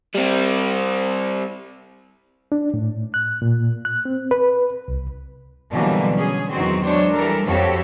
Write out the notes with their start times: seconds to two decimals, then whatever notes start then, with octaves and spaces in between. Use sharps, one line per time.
0.15 G3 C4
2.52 D4
2.74 A2
3.14 F#6
3.42 A#2
3.85 F#6
4.05 C4
4.31 B4
4.88 C2
5.72 B2 D3 E3 F#3 G3 A#3
6.16 C#4 G#4
6.52 E2 D#3 F#3 C4 F#4 C5
6.85 F#3 G#3 D4 C5 C#5
7.14 E3 G3 A4 A#4
7.47 F2 C4 F#4 G4 A4 C#5